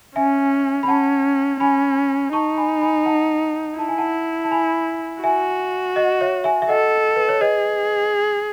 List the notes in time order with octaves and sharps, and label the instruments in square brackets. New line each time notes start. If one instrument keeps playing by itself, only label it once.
[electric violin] C#4 [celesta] E5 G#5
[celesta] B5
[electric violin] C#4 [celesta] F#5 A5
[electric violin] C#4 [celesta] G#5 B5
[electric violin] D#4 [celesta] A5 C#6
[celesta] G#5 B5
G#5 B5
F#5 A5
[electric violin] E4 [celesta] A5
[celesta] G#5
F#5 A5
A5
G#5 B5
[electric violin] F#4 [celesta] E5 G#5
[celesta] D#5 F#5
C#5 E5
E5 G#5
E5
[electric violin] A4 [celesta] D#5 F#5
[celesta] B4
C#5
[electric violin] G#4 [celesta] B4 D#5